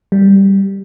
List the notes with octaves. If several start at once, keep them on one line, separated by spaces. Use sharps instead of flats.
G3